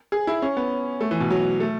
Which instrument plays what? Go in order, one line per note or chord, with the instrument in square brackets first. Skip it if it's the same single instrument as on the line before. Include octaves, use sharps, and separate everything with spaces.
[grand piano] G#4
E4
C#4
B3
A3
E3
B2
F#3
A3